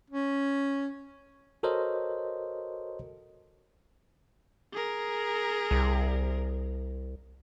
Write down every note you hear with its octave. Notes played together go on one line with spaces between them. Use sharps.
C#4
F#4 A4 A#4 C5 C#5 D#5
G#4 A#4
C2